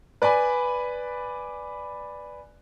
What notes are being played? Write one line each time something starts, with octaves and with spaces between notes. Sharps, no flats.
B4 D5 G#5 B5